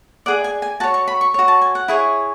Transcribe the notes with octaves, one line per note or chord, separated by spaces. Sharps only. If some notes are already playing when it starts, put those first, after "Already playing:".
G#4 D5 F#5
G#5
G#5
F#4 C#5 A5
C#6
B5
C#6
F#4 C#5
A5
G#5
F#5
E4 G#4 C#5